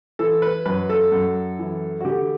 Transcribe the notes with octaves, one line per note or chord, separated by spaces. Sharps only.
E3 A4
B4
F#2 B4
A4
F#2
E3
F#4
D3 G4